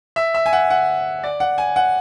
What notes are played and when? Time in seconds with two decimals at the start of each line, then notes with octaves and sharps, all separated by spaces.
0.16 E5
0.34 E5
0.46 G#5
0.53 F#5
0.70 F#5
1.23 D5
1.40 F#5
1.58 G#5
1.76 F#5